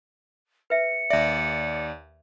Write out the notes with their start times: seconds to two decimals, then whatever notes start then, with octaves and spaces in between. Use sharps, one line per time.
0.70 B4 E5 C#7
1.10 D#2 D5 E5